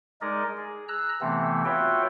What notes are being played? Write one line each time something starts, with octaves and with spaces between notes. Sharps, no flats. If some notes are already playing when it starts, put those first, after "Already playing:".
G#3 D#4 G#4 A#4 D5 D#5
G#4
A#5 E6 F#6
C3 E3 A3 B3 C4
F4 F#4 B4 C#5 E5 G5